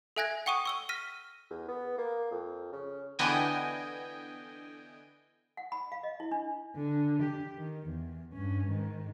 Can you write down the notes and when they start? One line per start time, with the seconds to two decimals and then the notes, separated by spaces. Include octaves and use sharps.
0.16 A4 E5 G#5 F#6 G#6 A#6
0.46 F#5 G5 C#6 D#6 D#7
0.65 C#6 E6 G7
0.89 F6 A#6 B6 D#7
1.50 E2
1.68 B3
1.98 A#3
2.31 F2
2.72 C#3
3.19 D3 E3 B3 D#5 G5 G#5
5.57 F#5
5.72 B5
5.92 F5
6.03 D#5
6.20 E4
6.31 D4
6.76 D3
7.23 G4
7.57 D#3
7.87 E2
8.33 G2 C#4
8.68 G#2 D#3